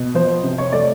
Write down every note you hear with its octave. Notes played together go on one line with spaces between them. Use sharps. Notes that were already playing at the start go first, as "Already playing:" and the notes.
Already playing: B2
F3 C5
C3
C#5
A3 D5